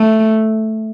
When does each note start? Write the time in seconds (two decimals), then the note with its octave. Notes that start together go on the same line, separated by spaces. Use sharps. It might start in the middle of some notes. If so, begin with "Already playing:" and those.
Already playing: A3